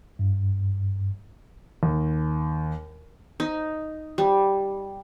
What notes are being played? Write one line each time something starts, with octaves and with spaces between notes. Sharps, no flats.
G2
D#2
D#4
G3